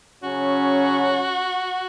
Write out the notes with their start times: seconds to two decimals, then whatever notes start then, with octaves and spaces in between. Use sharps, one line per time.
0.23 C#3 F#3 C#4 F#4